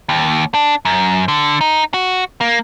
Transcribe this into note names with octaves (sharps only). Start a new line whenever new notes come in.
D#2
D4
F#2
D3
D#4
F#4
A#3